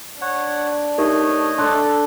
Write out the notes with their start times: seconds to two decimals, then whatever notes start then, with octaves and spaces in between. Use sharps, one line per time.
0.22 D4 C#5 F#5
0.98 A3 D#4 G4 A#4 C#5 D#5
1.58 D4 A4 C6 F#6